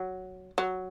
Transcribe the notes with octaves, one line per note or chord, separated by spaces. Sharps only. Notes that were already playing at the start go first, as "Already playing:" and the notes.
Already playing: F#3
F#3